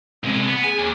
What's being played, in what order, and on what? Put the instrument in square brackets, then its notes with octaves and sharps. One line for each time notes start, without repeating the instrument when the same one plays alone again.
[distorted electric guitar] C2 G#3 [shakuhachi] C4
[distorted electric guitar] B3
[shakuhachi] G#4 [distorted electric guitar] G#5
[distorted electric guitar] D#2